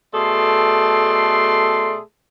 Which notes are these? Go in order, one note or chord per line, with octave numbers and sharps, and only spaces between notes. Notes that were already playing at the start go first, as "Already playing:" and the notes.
B2 A3 G#4 A4 D5 C6